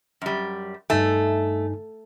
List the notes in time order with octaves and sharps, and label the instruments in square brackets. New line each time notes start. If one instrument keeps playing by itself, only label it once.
[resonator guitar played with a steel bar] F#2 G3
[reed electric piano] G2 D#4 G#5 [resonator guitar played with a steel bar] A3